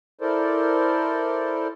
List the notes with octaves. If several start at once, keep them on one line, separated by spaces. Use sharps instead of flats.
E4 A4 A#4 C5 D5